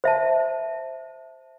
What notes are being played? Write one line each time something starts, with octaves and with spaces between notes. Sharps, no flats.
C5 E5 A5